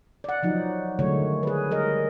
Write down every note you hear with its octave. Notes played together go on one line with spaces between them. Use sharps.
D5 F#5
F3 F#3 D#4
D3 D#3 F#3 G#3 A3 C#5
G#4 B4
G3 A#4 D#5